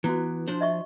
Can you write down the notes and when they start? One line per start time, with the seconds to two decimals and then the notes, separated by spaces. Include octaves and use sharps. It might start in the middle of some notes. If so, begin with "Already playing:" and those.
0.04 E3 B3 E4 F#4
0.48 F3 D4 C5
0.61 D#5 E5 C#6